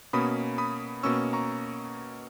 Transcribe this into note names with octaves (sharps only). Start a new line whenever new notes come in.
B2 A#3 C#4 B5 D#6
B5 D#6
B2 A#3 C#4 C#6 E6
A#5 C#6